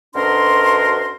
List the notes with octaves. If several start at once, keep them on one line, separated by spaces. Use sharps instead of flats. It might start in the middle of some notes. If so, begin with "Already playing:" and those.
D2 B2 C#4 D4 A#4 C6